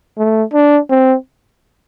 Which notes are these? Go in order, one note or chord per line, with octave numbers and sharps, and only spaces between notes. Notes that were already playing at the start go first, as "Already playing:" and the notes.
A3
D4
C4